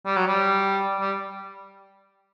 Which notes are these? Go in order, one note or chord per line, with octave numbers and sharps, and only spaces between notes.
G3
F#3
G3
G3